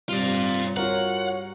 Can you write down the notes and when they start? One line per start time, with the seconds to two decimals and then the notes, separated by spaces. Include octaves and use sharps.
0.09 G2 C4 F4 D5
0.77 F4 F#4 A#4 C#5 F#5